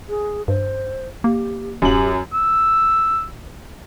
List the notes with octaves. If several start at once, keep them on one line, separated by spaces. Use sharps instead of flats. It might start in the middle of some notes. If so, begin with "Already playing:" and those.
G#4
G2 C5
A#3 G4
D1 F#2 G4 F#7
E6